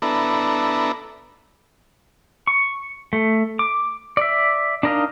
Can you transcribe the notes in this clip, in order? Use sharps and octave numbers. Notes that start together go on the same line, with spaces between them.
B3 D4 E4 A4 A#5
C#6
A3
D6
D5 E5
D4 D#4 A#4 D#5 F5